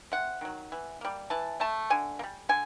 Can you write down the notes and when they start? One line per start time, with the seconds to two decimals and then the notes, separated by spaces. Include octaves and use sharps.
0.12 C3 F#5
0.41 D#3 F#3
0.72 E3
1.01 G3 A#3
1.30 E3 A5
1.60 A3 A5
1.90 D3 G#5
2.19 A#3
2.23 G3
2.49 D3 G#5